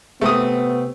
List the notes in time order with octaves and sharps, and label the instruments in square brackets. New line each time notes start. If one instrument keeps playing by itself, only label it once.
[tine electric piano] C3 C4 [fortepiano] A3 D#6 [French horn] B3